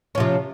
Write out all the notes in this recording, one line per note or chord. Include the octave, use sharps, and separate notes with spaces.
C3 F3 C#4